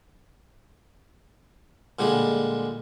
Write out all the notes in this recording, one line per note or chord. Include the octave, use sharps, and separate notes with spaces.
A#2 D3 G3 G#3 D4